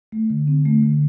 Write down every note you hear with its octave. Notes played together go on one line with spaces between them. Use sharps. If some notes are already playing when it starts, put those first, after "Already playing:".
A3
D3
C4
A3
D3